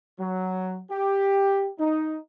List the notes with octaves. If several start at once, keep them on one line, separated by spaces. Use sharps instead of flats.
F#3
G4
D#4